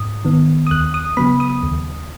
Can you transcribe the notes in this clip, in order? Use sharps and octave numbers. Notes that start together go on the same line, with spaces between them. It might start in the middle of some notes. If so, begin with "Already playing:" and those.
Already playing: G#2 D#6
D#3 B3
D#6
D#2 F#6
D#6
C#3 F#3 B3 B5
D#6
D#2